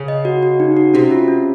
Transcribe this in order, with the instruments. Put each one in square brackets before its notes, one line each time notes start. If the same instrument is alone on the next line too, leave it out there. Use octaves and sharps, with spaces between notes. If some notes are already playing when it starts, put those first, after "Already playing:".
Already playing: [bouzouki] C#3
[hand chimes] D#5
F#4
F#4
D#4
F#4
[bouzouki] C3 [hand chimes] C#4
[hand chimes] F4
C#4